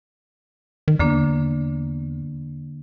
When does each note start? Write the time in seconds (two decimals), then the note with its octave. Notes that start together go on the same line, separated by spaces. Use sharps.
0.88 D#3
0.99 E2 D3 A#3 D4